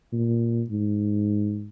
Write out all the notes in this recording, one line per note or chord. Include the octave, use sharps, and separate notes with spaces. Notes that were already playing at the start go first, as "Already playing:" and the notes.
A#2
G#2